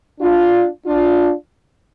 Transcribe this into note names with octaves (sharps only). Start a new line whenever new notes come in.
D4 F4
D4 F4